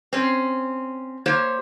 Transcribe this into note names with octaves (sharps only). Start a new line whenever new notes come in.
C4 C#4
A#3 G4 C5 C#5